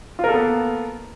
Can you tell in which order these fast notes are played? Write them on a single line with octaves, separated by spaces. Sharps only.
F4 A#4 A4 B3 A#3